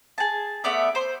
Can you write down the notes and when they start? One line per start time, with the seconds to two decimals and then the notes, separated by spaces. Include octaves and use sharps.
0.18 G#4 A5
0.64 A3 B3 D5 E5
0.95 C5 C6